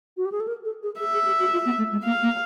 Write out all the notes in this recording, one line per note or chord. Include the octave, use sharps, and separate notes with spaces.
F#4
G4
G#4
A4
A#4
A4
G#4
G#4 E5
G#4
G4
F#4
F4
B3
A3
G#3
A#3 F5
A#3